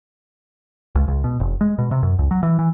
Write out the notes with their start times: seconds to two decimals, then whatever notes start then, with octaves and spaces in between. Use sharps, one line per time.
0.95 C#2
1.08 C#2
1.24 B2
1.40 F1
1.61 G#3
1.78 B2
1.91 C3
2.03 F#2
2.19 C#2
2.31 F#3
2.43 E3
2.59 E3